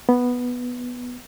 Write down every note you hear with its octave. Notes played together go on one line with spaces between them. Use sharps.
B3